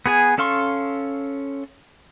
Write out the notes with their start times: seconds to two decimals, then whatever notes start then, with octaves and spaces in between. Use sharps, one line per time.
0.06 B3 G#4 G#5
0.38 C#4 A4 F5 C6 C#6